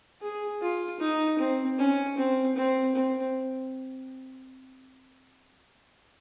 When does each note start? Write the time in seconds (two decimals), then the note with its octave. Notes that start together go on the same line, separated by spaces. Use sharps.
0.22 G#4
0.61 F4
1.00 D#4
1.39 C4
1.78 C#4
2.17 C4
2.56 C4
2.95 C4